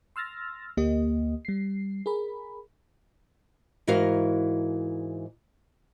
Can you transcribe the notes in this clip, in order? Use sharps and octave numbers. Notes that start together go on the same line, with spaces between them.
C6 E6 F6 A6 A#6
D2 A#3 G4 D#5
G3 C7
G#4 A#4 B5
G#2 E3 F#4 A#4 F5